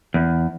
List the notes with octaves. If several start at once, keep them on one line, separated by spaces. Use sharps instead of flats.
E2